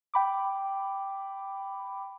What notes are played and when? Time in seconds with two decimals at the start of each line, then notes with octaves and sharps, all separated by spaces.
0.14 G5 B5 D6